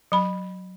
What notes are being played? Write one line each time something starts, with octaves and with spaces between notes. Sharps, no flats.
F#3 B5